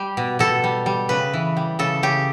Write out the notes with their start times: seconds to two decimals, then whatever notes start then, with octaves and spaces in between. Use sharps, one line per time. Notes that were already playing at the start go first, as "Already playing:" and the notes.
Already playing: G3 G4
0.17 B2
0.39 B2 A4
0.64 G3
0.86 G3
1.09 C#3 B4
1.33 E3
1.57 G3
1.79 C#3 A4
2.03 C#3 G4